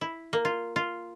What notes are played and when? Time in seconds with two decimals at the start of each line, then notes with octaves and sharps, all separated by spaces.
0.01 E4
0.33 A#3
0.45 F4
0.76 F4